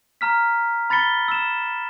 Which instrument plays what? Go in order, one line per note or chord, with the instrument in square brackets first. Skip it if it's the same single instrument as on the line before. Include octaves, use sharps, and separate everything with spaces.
[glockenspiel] A#5 F6 B6
B5 A6 B6 C#7 G7
E6 E7